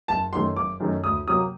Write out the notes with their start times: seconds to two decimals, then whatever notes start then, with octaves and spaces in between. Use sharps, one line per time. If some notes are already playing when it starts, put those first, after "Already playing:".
0.08 F#1 A5
0.33 F#2 D#3 A3 C6
0.56 F#1 D6
0.80 F#2 D#3 A3
1.04 D2 D#6
1.27 C3 F#3 A#3 D#6